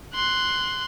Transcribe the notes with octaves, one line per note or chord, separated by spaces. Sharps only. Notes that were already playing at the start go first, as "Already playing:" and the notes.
C6 F#6